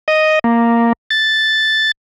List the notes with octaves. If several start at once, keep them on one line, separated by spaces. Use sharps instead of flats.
D#5
A#3
A6